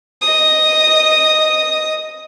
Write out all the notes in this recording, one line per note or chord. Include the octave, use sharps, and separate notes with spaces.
D#5 D#6